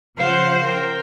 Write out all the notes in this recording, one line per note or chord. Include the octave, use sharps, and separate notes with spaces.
C#3 F3 C5 F5 F#5
A#4 G5